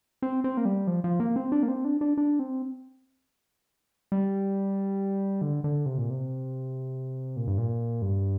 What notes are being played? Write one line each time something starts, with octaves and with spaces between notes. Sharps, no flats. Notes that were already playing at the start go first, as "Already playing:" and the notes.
C4
C4
A#3
G3
F3
F3
A#3
C4
D4
A#3
C4
D4
D4
D4
C4
G3
D3
D3
C3
A#2
C3
A#2
G2
A#2
G2